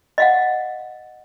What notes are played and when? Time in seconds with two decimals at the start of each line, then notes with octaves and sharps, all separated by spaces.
0.18 D#5 F5 F#5